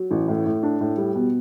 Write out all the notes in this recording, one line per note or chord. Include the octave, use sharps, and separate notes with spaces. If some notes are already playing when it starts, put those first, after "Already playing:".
Already playing: F#3
A1
A2
A2
D4
A2
G3
B2